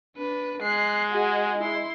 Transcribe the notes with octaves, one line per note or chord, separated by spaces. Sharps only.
D4 B4
G#3 F#6 C7
F#4 G#4
E4 C6